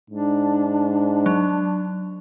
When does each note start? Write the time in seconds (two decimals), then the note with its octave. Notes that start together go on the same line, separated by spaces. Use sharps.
0.10 G#2 D4
1.26 F#3